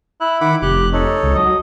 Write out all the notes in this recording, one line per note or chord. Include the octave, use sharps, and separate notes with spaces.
E4 F#6
D#3 F#5 B5 D6
F1 G4 F#6
D#4 A4 C#5
C#2
F#3 D#5